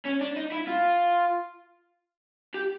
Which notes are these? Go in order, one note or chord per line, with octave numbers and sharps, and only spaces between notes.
C#4
D4
D#4
E4
F4
G4